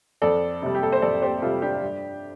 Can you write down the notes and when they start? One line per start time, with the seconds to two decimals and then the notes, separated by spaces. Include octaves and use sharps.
0.22 F2 A4 D5
0.62 C3 G3
0.75 G4
0.83 A4
0.92 C5
1.02 F2 A4 D5
1.22 G4 C5
1.42 C3 G3 F4 A4
1.62 D4 G4
1.82 G2